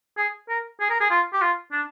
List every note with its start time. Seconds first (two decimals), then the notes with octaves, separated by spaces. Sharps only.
0.17 G#4
0.49 A#4
0.80 G#4
0.90 A#4
1.01 G#4
1.10 F4
1.33 G4
1.42 F4
1.72 D4